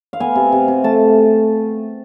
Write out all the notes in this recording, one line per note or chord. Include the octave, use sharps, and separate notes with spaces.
F5
B3 G#5
C3
C3
C3
A3 A5